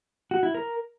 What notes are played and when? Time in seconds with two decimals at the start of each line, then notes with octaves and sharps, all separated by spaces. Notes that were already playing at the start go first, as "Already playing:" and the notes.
0.31 F#4
0.43 E4
0.55 A#4